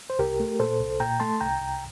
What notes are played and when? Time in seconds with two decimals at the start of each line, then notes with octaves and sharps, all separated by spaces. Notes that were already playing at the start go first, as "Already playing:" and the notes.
0.10 C5
0.19 C2 G4 A#4
0.40 A3
0.59 A#2 A4 C5
0.80 C2
1.00 A#2 G5 A#5
1.20 A3 A5 C6
1.41 C2 G5 A#5
1.61 C2